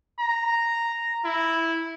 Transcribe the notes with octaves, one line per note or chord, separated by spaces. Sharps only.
A#5
E4